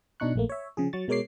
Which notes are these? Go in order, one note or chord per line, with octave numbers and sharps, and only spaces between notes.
B2 D4 D#4 C#6 F#6
A#1 A3 A#3
C#5 E5
C#3 F3 G#4
F#3 C#6 A6
B2 G#3 A#4 C#5 D6 C7